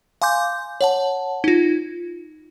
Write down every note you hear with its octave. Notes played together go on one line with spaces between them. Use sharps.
F5 G#5 C6 D6 G6
C#5 F#5 A5
D#4 F4